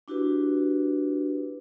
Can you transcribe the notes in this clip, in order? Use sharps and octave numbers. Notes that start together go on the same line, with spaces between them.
D4 E4 F#4 G4 B4